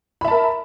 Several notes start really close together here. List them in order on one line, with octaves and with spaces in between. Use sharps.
B5 E5 A5 A#4